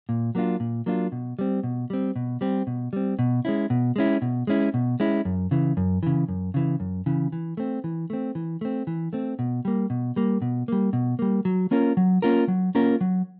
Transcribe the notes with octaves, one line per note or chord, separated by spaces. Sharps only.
A#2
F#3 A#3 D4 F4
A#2
F#3 A#3 D4 F4
B2
G3 C4
B2
G3 C4
B2
G3 C4
B2
G3 C4
B2
G#3 C#4 E4
B2
G#3 C#4 E4
B2
G#3 C#4 E4
B2
G#3 C#4 E4
F#2
C#3 E3
F#2
C#3 E3
F#2
C#3 E3
F#2
C#3 E3
E3
A3 C4
E3
A3 C4
E3
A3 C4
E3
A3 C4
B2
G3 A#3
B2
G3 A#3
B2
G3 A#3
B2
G3 A#3
F#3
A#3 C#4 F4 A#4
F#3
A#3 C#4 F4 A#4
F#3
A#3 C#4 F4 A#4
F#3